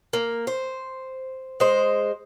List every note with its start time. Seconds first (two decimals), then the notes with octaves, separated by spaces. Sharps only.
0.13 A#3
0.47 C5
1.60 G#3 C5